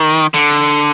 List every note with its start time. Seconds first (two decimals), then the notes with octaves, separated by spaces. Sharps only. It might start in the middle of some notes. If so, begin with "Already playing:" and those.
Already playing: D#3
0.34 D3